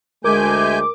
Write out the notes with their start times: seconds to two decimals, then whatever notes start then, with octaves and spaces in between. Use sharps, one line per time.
0.24 D2 G#3 A3 A#4 G#5 D6 G6